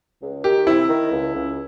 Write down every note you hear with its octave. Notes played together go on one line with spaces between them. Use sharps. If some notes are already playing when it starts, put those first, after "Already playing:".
C#2
D#3 G4
C3 E4
D#3
C#2
C#2